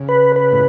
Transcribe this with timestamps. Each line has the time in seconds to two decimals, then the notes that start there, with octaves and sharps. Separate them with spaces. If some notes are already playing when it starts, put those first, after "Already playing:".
Already playing: C#3
0.09 B4
0.36 B4
0.52 A2